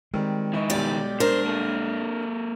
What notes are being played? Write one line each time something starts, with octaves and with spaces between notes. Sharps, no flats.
D#3 G3 G#3 C4
D#3 E4 D#5 C#6
B1 G3 G4 D5
D4 A#4 C5
A#3 A4